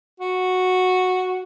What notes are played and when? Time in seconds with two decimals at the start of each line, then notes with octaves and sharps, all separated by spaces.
0.20 F#4